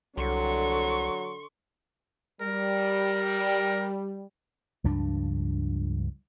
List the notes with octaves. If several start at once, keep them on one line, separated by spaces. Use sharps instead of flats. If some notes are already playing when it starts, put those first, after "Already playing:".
C2 D3 F#3 C6 C#6
G3 A#4
C#2 G2 F3 D4